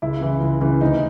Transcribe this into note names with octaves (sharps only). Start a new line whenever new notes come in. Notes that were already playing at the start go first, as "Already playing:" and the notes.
C#2 E4
C#3 E3
C#2
C#3 E3
D2 D#4